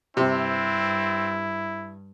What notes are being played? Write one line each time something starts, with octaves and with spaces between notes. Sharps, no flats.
G2 C3 C4 E4